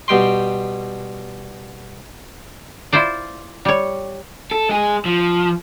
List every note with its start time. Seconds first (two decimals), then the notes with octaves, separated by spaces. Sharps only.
0.08 B2 G3 G5 C6
2.93 E4 F4 C5 D5
3.65 G3 C#5
4.51 A4
4.69 G#3 G#4
5.05 F3